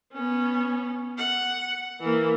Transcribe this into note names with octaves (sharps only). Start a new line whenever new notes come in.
B3 C#4
F#5
E3 A#3